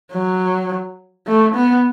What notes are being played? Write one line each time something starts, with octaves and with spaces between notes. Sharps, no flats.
F#3
A3
B3